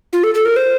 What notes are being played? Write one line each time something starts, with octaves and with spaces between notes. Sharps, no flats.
F4
A4
A4
A#4
C5